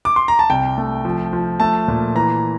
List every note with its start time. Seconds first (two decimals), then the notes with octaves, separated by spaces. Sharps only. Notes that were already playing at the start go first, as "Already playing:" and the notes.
0.05 D6
0.16 C6
0.28 A#5
0.39 A5
0.50 C2 G5
0.78 A3
1.05 F3
1.33 F3
1.60 A3 A5
1.88 A#2
2.15 E3 A#5